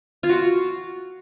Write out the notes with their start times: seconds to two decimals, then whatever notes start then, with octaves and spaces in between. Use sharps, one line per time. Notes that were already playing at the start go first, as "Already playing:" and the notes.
0.23 F4
0.29 F#4